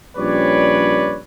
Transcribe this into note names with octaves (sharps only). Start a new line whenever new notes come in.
A#1 G3 C#4 B4 C#5 D5